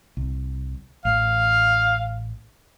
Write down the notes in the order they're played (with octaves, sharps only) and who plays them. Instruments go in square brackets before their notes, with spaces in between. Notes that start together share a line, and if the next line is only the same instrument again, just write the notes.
[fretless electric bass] C2
[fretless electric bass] A1 [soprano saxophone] F5